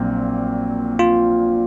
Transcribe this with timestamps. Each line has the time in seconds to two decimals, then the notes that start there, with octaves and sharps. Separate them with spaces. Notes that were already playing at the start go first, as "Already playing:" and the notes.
Already playing: A#1 A#2 F#3 C4
0.99 F4